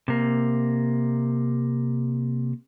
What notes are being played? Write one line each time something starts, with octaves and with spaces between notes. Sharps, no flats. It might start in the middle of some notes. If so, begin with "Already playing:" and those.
C3 A#3